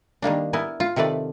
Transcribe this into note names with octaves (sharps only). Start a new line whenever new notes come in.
D#3 G3 A#3 D4
B3 E4 A#4 G#5
F4
C3 D#3 A3 B4 D5